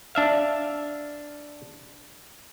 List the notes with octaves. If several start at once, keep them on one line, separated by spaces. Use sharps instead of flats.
D4 E5 F5